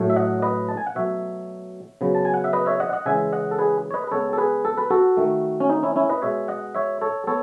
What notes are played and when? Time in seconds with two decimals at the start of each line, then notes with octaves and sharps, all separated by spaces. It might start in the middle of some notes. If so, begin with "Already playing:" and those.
Already playing: A2 F#3 A3
0.10 E5
0.16 D#5 F#5
0.42 B4 D#5
0.69 A5
0.77 G#5
0.87 F#5
0.95 B2 F#3 A3 C#5 E5
2.01 C#3 F#3 B3
2.15 A5
2.25 G#5
2.34 F#5
2.44 E5
2.53 B4 D#5
2.66 C#5 E5
2.80 D#5 F#5
2.93 D#5 F#5
3.06 C#3 E3 G#3 E5 G#5
3.32 D#5 F#5
3.51 A4
3.58 G#4 B4
3.91 C#5
3.94 B4 D#5
4.07 B4
4.11 C#3 G#3 B3 A4 C#5
4.33 A4
4.38 G#4 B4
4.65 A4
4.78 B4
4.90 F#4 A4
5.17 D#3 A3
5.60 C#4
5.69 D#4
5.83 C#4 E4
5.96 C#4 E4
6.09 B4 D#5
6.22 B2 G#3 B3 C#5 E5
6.48 D#5 F#5
6.75 C#5 E5
7.01 A4 C#5
7.27 B3 A4 C#5